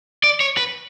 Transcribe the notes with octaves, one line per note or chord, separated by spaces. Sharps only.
D5
C#5
B4